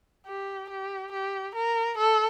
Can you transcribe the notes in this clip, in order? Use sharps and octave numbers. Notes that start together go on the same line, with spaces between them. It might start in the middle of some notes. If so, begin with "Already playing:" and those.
G4
G4
G4
A#4
A4